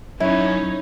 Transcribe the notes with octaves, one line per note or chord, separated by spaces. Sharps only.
F#2 C#4 D#4 E4 C#5